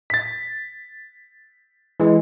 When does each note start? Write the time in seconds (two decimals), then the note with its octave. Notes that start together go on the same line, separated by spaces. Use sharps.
0.10 A6 B6
2.00 E3 G#3